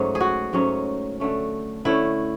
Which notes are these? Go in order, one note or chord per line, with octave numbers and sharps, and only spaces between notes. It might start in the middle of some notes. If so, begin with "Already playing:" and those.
Already playing: G#2 F#3 A3 C#4
G#4
F#4
G#2 F#3 A3 C#4
D3 A3 C#4
D3 A3 C#4 E4